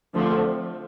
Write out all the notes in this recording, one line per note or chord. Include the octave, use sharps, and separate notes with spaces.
D3 F3 A3 C4